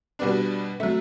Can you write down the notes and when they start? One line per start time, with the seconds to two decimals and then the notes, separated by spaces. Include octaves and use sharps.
0.19 B2 G3 B3 D4 D5
0.80 F#3 A3 E5